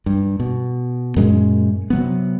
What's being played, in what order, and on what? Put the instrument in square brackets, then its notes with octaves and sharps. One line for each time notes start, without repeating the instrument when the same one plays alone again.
[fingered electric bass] G2
B2
F#2 A#2 G#3 C#4
C3 F#3 B3